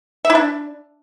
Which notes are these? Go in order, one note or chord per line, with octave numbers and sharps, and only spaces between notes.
E5
E4
D4